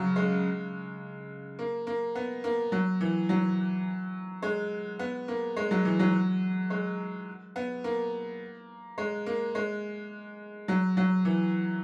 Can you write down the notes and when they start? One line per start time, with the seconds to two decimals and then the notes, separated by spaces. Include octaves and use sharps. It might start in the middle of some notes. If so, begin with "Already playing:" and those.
Already playing: C#3 F#3
0.16 G#3
1.59 A#3
1.87 A#3
2.15 B3
2.44 A#3
2.72 F#3
3.01 E3
3.29 F#3
4.42 G#3
4.99 B3
5.28 A#3
5.57 G#3
5.71 F#3
5.85 E3
5.99 F#3
6.70 G#3
7.56 B3
7.84 A#3
8.98 G#3
9.26 A#3
9.55 G#3
10.68 F#3
10.97 F#3
11.25 E3